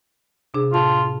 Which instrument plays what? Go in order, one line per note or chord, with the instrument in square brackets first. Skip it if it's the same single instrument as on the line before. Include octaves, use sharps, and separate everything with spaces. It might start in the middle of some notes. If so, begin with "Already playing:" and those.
[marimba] C3 D4 G#4
[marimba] A2 A5 [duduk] F4